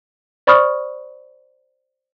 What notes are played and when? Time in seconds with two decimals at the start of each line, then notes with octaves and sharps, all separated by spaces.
0.47 C5 D5 B5 C#6 D#6 F6